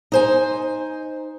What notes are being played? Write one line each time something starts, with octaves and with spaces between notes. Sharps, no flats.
D#4 C5 G#5